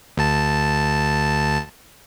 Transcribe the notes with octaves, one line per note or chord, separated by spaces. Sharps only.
D2 A5